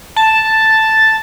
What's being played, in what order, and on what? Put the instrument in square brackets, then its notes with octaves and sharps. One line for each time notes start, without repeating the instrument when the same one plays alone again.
[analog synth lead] A5